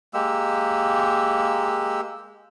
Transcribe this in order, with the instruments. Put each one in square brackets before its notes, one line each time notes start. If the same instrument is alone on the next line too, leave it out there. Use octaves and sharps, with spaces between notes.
[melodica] G#3 A#3 G4 E6